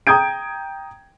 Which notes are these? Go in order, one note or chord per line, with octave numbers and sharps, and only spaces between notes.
G5 A#5 D#6 G6 G#6 D7